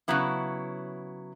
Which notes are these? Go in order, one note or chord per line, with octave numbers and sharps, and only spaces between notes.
C#3 F#3 B3 E4